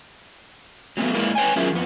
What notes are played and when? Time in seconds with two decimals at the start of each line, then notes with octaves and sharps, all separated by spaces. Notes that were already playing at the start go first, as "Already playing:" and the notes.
0.97 F#3 G3 A3 B3
1.14 G#3 A#3 E4 A#4 D5
1.35 B4 C#5 G5 G#5
1.56 F#3 C#4 F4 G#4 A#4 E5
1.72 F2 B3